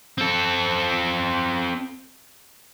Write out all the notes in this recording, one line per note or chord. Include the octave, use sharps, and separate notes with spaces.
C4 A4